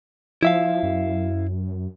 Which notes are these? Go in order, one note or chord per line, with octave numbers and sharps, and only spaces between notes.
F3 E4 E5 F5
F#2